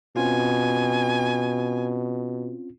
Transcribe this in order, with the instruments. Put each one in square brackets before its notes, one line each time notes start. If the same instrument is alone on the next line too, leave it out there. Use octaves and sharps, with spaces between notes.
[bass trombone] B2 [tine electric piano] C4 C#4 F4 [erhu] G#5